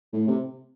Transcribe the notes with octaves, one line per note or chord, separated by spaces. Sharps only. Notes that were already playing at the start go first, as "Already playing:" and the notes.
A2
C3